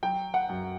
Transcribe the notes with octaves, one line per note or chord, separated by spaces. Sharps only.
F#3 G5
F#5
F#2